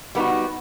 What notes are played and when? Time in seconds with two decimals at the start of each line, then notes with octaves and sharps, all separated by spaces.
0.15 G3 B3 D#4 F#4